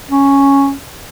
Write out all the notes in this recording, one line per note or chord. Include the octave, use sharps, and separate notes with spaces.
C#4